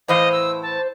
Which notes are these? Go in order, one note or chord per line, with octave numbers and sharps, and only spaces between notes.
A2 E3 C5 D#5 F5
E6
A5